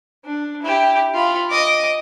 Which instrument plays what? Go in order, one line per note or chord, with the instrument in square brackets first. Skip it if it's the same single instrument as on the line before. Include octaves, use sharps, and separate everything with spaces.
[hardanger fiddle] D4
E4 G4
F4 B5
D#5 D6